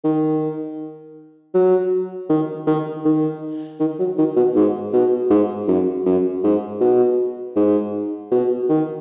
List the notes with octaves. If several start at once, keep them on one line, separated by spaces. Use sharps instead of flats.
D#3
F#3
D#3
D#3
D#3
D#3
F#3
D#3
B2
G#2
B2
G#2
F#2
F#2
G#2
B2
G#2
B2
D#3